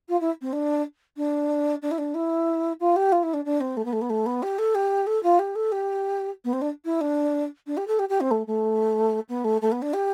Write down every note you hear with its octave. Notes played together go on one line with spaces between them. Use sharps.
F4
E4
C4
D4
D4
D4
E4
D4
E4
F4
G4
F4
E4
D4
D4
C4
A3
B3
A3
B3
A3
B3
G4
A4
G4
A4
F4
G4
A4
G4
B3
C4
D4
E4
D4
D4
G4
A4
G4
G4
C4
A3
A3
B3
A3
A3
B3
D4
G4